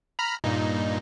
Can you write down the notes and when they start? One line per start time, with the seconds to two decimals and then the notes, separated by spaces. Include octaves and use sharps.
0.19 A#5 B5 F6
0.44 G2 A#2 D#4